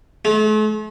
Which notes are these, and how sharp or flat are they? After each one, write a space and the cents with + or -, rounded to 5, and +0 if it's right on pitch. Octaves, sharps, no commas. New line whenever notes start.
A3 -45